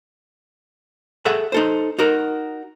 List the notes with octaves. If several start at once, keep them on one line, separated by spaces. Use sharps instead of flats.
G#4 A4 E5 F#5
D#4 A4 C5
D#4 F#4 A#4